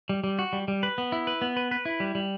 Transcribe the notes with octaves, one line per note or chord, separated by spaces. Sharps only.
G3
G3
F#4
G3
G3
B4
B3
E4
B4
B3
B4
B4
E4
G3
G3